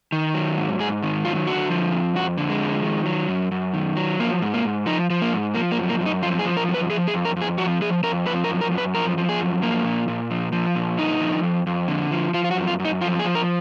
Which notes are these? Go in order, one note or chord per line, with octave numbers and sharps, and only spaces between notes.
D#3
F#3
G#2
G#2 G#4
D#3
F#3 F4
D3 F#4
F3
F2
F2 F#4
D3
G#3
F3
D#3
F#3
F#2
F#2
D#3
F#3
F3 A#3
G#2
A#3
G#2
F3 D#4
F3
A#3
G#2
F3 A#3
A#3
F#2
A#3
F#2
D#4
F3 F4
G#4
F3
A#4
F#2
B4
F3 G#4
G#4
F2
A#4
F2
G#4
F3 F#4
F3 G#4
F2 A#4
F3 B4
A#4
F#2
A#4
F#2
B4
F3 A#4
F3
G#4
F#2
F3 A#3
A#2
A#2
F3
F3
A#2
D3 D#4
F3
F2
F2
D3
F3
F3 F4
F4
F#4
F#2
F4
F#2
D#4
F3 F4
G#4
F3
A#4